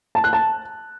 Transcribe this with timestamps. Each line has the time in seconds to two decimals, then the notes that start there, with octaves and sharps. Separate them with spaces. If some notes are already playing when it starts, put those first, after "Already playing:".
0.15 A5
0.24 F#6
0.33 A5